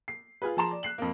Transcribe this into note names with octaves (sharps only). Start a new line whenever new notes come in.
C7
F4 G#4 B4
F3 G#4 A5 A#5 C6 E7
D5
F#6 C7 F#7
F2 A#3